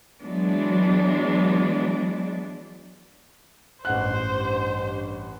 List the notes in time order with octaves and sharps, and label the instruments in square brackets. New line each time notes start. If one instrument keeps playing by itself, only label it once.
[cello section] E3 F#3 G#3 B3 D4
[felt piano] A1 F#5 F#6 [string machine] G2 [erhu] C5